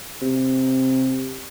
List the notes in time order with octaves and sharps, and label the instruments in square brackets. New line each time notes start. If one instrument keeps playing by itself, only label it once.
[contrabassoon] C3